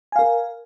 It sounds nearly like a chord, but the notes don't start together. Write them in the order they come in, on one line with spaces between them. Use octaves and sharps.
G#5 F5 A#4